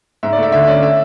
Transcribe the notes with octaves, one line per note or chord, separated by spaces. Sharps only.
G#2 E5
D5
A3 E5
D3 E5
C#4 D5
E5